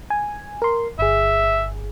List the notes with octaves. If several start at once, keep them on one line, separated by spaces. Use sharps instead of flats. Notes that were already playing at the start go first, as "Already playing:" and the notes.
G#5
A#4 C6
G1 G#4 E5